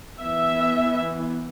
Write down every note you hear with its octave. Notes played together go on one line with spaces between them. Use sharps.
E3 B3 E5